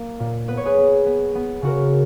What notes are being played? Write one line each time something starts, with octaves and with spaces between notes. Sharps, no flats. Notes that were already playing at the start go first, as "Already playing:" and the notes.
Already playing: A#3 A#4
A#2
B3 B4
C#5
G#4 B4
B3
B3
B3
C#3 F#4 A#4